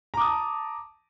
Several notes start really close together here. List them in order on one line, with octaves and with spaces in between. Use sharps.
A#5 D6 D#6 A5